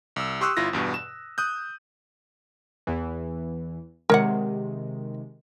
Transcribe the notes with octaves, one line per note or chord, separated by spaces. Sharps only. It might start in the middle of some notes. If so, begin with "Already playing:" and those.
C2 E6
G4 C6 C#6 D#6 E6 F#6
G1 E4 F4 A#6
E2 G2 B2
E7
D#6 F#6 G6
E2 E3
C3 D#3 G#3 A#4 C#5 F#5